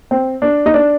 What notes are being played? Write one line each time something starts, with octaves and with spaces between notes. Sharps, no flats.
C4
D4
D#4
D4